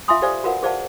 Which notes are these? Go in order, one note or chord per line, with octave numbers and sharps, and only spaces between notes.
F4 E5 F5 G#5 C6 D#6
G4 A4 C5 D5 F5 G#5
F4 F#4 A#4 B4 F5 F#5
G#4 C5 D5 F5 F#5 A5